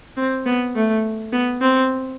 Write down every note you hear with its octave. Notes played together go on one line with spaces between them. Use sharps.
C4
B3
A3
B3
C4